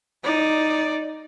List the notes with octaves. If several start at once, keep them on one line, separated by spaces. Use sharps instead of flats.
D#4 D5